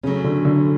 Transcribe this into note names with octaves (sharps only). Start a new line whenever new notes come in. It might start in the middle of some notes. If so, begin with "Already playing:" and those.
C#3 F#3 A3 C#4
D3
D3